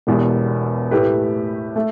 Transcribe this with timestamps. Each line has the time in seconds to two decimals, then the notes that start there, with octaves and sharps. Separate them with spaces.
0.07 E1 E2 B2 B3 G4
0.91 A2 A3 G4 B4
1.76 A3